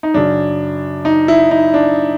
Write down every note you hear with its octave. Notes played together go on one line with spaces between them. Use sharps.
D#4
F#2 C#3 F#3 D4
D#4
E4
D#4
D4